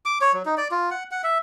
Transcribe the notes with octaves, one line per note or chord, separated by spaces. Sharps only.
D6
C#5
F#3
D#4
D5
F4
F#5
F#5
E5